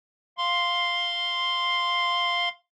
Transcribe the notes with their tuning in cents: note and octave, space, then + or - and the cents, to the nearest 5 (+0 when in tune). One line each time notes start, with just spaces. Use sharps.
F5 +0 C6 +0